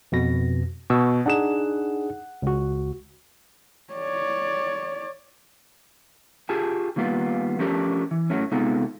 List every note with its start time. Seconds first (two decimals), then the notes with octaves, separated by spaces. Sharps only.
0.12 F2 B2 A#6
0.90 B2 C#6 E6
1.26 D4 D#4 G#4 F#5 E7
2.42 C#2 F#4
3.93 C#5 D5
6.49 F4 G4 G#4 G#5 A5
6.96 D#3 G3 A#3 B3 F4
7.59 F3 A3 C#4 D4 G4 A#4
8.11 E3
8.30 A2 F#3 A3 C#4
8.52 C3 G#3 B3 D#4 F4 A4